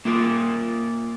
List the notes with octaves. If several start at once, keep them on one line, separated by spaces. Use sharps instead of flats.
A#3 F4 A#4 E5